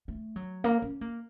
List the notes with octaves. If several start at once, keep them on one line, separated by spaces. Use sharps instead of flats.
A3
F#3
A#3
C#4
A#3